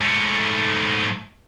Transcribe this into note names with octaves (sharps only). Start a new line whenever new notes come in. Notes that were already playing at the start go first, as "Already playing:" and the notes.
G#2 A3